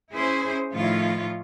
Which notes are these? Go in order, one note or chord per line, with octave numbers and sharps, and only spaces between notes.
C#4 E4 G#4 C5
A2 D#3 F3 E4 F4 C#5